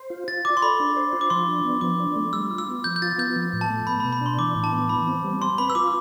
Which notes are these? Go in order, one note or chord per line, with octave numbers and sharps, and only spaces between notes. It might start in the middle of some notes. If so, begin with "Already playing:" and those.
Already playing: C5
F4
F4 A6
D5 D6
C6
A4 B5
D4
C5
F4
D6
F3 C6
D4
B3
F3 D6
D4
A3
G3 E6
F4
E6
B3
F3 G6
G6
F4 A6
B3 G6
F3
A2
A5
A3
B3 B5
B5
B2
B5
D4
C6
E3 D6
A2
A5
B3
E3 B5
C4
G3
C4 C6
B4 B5
E6
F4 D6